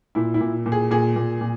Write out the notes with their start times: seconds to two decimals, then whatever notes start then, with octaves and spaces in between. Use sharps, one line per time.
0.15 A#2 E4
0.34 E4
0.41 A#2
0.66 A#2
0.72 G#4
0.91 A#2 G#4
1.16 A#2
1.41 A#2